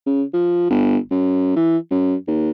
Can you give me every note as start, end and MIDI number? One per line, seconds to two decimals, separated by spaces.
0.06 0.23 49
0.34 0.68 53
0.70 0.97 31
1.11 1.52 42
1.56 1.77 52
1.91 2.15 42
2.28 2.50 39